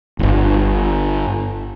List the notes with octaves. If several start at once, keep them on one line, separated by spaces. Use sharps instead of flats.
D1 G1